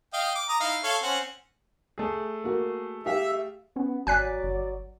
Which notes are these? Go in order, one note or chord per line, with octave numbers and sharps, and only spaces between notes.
D#5 F5 G5
D6
A#5 D#6
D#4 E4 F5
A4 C#5 F5
C4 C#4 F#5
A3 G#4
A#3 F#4
G4 E5 F5
B3 C#4
G#1 F#3 D5 G#5 F#6 B6
G1